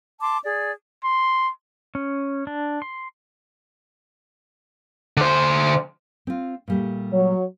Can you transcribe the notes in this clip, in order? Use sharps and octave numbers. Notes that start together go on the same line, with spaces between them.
A5 C6 D6
G#4 D5
C6
C#4
D4
C6
D3 C5
C4 F4
A#2 G3 A3
F#3 C#5